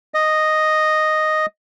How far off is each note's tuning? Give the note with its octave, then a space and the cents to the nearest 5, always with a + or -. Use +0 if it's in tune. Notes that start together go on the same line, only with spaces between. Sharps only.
D#5 -5